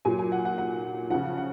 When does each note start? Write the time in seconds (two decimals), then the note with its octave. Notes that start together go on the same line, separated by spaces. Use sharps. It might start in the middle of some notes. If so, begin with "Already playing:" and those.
0.05 A#2 F#3 G#5
0.19 G#5
0.32 F#5
0.45 F#5
0.58 F#5
1.10 C#3 F3 F#5
1.37 F#5